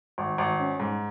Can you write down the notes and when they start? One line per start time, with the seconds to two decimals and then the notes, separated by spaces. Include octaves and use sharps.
0.18 G#1
0.38 G#1
0.59 C#4
0.79 G#2